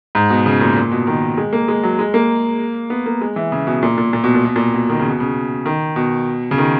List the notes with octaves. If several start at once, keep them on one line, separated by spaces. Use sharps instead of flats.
G#2
B2
C#3
A#2
A#2
B2
D#3
G#3
A#3
G#3
F#3
G#3
A#3
B3
A#3
G#3
E3
C#3
B2
A#2
A#2
A#2
B2
A#2
B2
A#2
B2
D#3
C#3
B2
C#3
D#3
B2
C#3
D#3